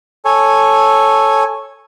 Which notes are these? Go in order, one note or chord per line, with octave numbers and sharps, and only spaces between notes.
A4 C#5 G#5